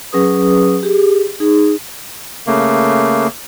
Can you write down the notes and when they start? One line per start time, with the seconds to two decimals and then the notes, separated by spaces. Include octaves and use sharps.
0.12 F#3 C#4 G#4 B4 D#6
0.83 G4 G#4
1.40 D#4 G#4
2.47 C#3 A3 A#3